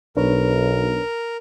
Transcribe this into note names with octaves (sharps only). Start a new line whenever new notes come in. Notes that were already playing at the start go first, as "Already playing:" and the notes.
B1 D4 A#4 B4 C#5